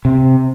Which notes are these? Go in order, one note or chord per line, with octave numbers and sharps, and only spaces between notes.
C3